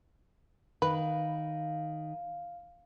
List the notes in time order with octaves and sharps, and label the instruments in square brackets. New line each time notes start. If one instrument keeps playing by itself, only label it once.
[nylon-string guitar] D#3 [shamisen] B4 [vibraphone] F5